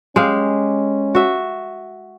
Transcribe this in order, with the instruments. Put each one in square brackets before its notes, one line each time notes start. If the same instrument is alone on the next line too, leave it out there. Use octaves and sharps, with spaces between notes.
[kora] G#3 G4 F5 [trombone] C#4
[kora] F#4 E5